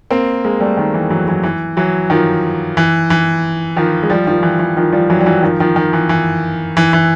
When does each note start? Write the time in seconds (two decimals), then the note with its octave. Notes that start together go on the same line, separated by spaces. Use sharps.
0.11 A#3 C4
0.45 G#3 A#3
0.60 G3 A3
0.77 D#3
0.94 E3
1.10 E3 F#3
1.28 E3 F#3
1.43 E3
1.77 E3 F#3
2.10 D#3 F3
2.77 E3
3.10 E3
3.76 D#3 F3
4.03 G#3
4.10 F3 G3
4.27 D#3 F3
4.43 E3
4.59 E3
4.77 D#3 F3
4.93 F3 G3
5.10 E3 F#3
5.20 G3
5.26 E3 F#3
5.42 D#3 F3
5.60 D#3 F3
5.76 D#3
5.93 E3
6.09 E3
6.77 E3
6.93 E3